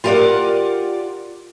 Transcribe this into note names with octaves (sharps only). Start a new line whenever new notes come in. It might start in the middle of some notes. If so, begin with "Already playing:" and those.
F4 G4 A#4 C#5 D5 F#5